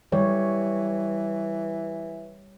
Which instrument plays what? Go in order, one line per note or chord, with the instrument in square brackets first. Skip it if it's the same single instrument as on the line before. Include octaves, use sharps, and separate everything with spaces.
[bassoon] E3 [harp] G3 [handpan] C#5